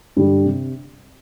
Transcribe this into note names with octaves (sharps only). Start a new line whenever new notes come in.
G2 D3 G3
C3